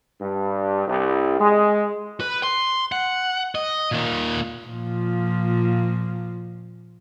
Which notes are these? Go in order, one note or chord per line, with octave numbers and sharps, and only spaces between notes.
G2
C2
G#3
B4
C6
F#5
D#5
A#2 D#3
A#2 F3